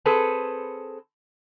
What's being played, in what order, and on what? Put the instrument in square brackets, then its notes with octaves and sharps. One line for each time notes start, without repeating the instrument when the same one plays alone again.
[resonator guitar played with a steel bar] C4 G#4 A4 B4